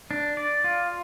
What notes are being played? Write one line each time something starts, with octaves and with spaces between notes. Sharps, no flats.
D4
D5
F4